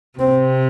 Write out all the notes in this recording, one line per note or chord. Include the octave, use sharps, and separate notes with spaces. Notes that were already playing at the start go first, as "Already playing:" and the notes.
C3 C4